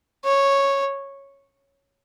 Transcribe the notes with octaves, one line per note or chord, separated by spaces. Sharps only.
C#5